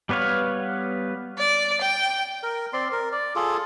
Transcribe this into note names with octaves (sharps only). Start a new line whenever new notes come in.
G3 B3 B4 C#5 F5
D5
G5
A#4
C4 D5 C6
A#4
D5
F4 G#4 A4